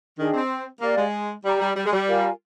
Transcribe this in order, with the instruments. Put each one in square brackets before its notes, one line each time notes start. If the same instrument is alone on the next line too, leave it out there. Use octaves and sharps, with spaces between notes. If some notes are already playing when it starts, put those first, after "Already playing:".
[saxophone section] D#3 [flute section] D4 G#4 D#5 G5
[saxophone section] C4
[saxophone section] A#3 [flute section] G4 D5 F5
[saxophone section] G#3
[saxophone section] G3 [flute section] G4 D5 G5 A#5
[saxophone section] G3
G3
G#3
G3
[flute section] F4 A#4 F5 G#5